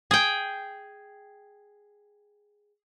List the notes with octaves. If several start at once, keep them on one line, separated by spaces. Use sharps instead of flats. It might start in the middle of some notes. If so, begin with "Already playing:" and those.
G#4 G5